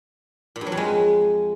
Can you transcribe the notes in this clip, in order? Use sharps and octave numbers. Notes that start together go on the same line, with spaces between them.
A#2
G2
F#3
F2
G#3